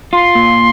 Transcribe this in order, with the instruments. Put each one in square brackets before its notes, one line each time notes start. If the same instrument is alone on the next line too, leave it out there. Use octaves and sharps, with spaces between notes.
[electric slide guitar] F4 [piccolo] C6
[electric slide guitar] A#2